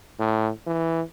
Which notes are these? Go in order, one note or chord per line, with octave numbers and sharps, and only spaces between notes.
A2
E3